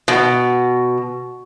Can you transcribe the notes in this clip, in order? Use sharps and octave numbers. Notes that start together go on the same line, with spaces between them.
B2